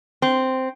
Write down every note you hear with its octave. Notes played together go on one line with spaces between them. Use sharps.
C4